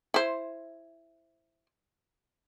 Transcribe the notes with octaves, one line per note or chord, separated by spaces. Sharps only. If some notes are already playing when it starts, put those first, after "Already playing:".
E4 C5